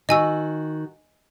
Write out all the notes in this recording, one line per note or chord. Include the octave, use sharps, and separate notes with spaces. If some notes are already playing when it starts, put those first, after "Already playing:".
D#3 F#4 D#5 G#5 E6